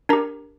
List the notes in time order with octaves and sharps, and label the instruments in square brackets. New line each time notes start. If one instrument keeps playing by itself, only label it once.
[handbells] D4 G4 A#4 A#5